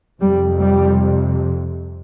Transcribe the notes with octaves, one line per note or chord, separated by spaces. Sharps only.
F2 C3 G3
G3